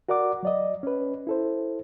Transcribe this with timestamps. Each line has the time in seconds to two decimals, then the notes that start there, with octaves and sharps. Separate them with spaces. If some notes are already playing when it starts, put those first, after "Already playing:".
0.09 F#4 A#4 D5 F#5 D6
0.43 F#3 D5 D#5
0.83 C#4 B4
1.27 E4 A4 C5